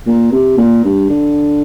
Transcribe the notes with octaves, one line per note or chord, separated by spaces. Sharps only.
A#2
C3
A#2
G2
D3